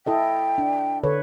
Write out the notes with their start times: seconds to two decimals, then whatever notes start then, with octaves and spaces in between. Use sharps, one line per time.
0.06 E4 A4 D#5 G5
0.58 D4
1.04 D3 A4 B4 C#5